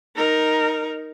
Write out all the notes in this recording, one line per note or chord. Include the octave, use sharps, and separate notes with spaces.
D#4 A#4